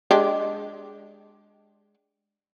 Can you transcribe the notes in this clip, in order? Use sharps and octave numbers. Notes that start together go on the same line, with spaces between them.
G#3 D4 G4